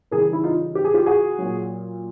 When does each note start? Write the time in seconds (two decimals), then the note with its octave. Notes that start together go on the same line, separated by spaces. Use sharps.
0.11 C#3 E3 G3 G#4 A#4
0.33 E4
0.44 D#4 F4
0.75 G4
0.84 G#4
0.94 F4 G4
1.06 F#4 G#4
1.38 A#2 F#3